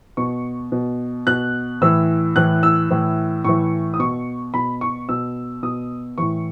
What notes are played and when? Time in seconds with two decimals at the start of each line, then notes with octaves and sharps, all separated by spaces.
0.17 B2 C#6
0.72 B2
1.27 B2 F#6
1.81 A2 E3 E6
2.36 A2 E3 F#6
2.63 E6
2.90 A2 E3
3.44 A2 E3 C#6
3.94 D#6
3.99 B2 C#6
4.54 B2 B5
4.81 C#6
5.09 B2 E6
5.63 B2 D#6
6.18 A2 E3 C#6